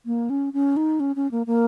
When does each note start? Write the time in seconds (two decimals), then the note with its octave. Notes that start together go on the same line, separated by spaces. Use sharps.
0.06 A#3
0.30 C#4
0.53 C#4
0.77 D#4
1.00 C#4
1.16 C#4
1.31 A#3
1.47 A#3